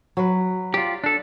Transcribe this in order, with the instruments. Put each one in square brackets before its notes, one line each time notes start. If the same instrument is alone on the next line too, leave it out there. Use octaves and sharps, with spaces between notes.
[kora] F#3 B4
[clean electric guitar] F4 G4 [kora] D5
[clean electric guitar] D4 A4